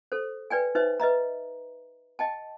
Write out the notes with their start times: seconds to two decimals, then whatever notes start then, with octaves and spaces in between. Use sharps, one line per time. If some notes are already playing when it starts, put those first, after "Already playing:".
0.12 A4 C5
0.50 B4 D5 G5 G#5
0.75 D#4 B4 C5 E5
1.00 B4 D#5 E5 A#5
2.19 D#5 G5 A5